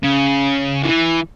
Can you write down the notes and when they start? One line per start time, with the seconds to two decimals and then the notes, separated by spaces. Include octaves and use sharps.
0.03 C#3
0.83 E3